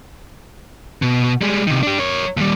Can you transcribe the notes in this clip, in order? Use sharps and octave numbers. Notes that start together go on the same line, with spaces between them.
B2
G3 G#3
C3 D#3
D4 G4
A#4 C#5
D#2 G3